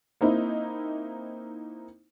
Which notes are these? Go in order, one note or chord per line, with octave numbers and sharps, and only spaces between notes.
A#3 C4 D#4 E4